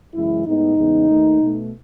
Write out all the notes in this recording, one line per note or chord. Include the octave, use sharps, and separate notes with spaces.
F#2 C#3 E3 G#3 E4
A2 G#3 B3 D#4
E2 C#3 G#3 B3
D#2 D#3 A3
B2 A3